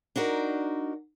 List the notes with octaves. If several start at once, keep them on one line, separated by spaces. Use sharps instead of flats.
D4 D#4 F#4 A#4